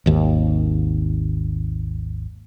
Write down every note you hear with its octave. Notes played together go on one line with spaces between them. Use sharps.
G#1 D#2